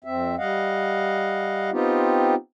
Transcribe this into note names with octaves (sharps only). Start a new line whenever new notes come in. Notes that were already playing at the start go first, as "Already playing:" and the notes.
F2 C4 E5
G3 D#5 F5 F#5
B3 C4 D#4 F4 G4